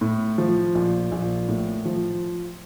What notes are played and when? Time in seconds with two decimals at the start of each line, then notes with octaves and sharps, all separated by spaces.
0.01 A2
0.38 F3
0.75 A#1
1.12 A#1
1.48 A2
1.85 F3